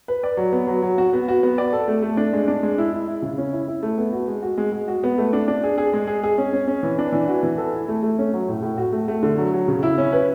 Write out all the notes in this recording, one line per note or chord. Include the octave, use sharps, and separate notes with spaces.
B4
D5
F#3
B3
F#3
F#3
F#4
B3
F#4
B3
D5
A4
A3
A3
D4
G#3
D4
G#3
E4
E4
E4
C#3
C#4
E4
E4
A3
B3
F#4
G#3
F#4
G#3
G#3
F#4
B3
A3
D4
D4
G#4
G#4
G#3
G#4
G#4
C#4
C#4
C#4
E3
D4
E3
F#4
E3
A4
E4
A3
A3
C#4
F#3
A2
A2
F#4
A3
A3
D3
F#3
F#3
C#3
E4
C#4
B4